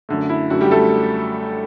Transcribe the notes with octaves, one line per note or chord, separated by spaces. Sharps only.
F#2 D3 A3
E4
F#2 D3 A3 F#4
G3 G4
A3 A4